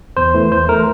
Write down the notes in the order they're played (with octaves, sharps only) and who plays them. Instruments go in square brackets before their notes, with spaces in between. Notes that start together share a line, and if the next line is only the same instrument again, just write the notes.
[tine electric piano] E2 C5
E3 A3
E2 C5
E3 A3 A#4